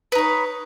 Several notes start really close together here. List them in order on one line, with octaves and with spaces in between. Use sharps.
B4 D#4 C#5